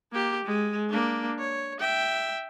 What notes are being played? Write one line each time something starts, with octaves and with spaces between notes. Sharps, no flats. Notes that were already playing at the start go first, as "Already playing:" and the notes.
A#3 G4
G#3
A#3 D4
C#5
E5 G5